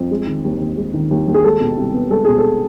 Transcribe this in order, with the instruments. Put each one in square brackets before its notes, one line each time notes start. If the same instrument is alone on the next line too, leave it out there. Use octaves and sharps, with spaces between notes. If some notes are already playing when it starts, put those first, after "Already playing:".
Already playing: [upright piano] F2
G#3
D#3
D#2
D#2
G#3
D#3
D#2
D#2
G#4
G#3 A4
B2
C2
B3
G#3 A4
B2 G#4
A4